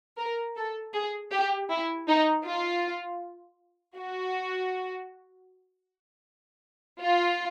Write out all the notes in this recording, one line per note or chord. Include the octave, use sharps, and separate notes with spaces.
A#4
A4
G#4
G4
E4
D#4
F4
F#4
F4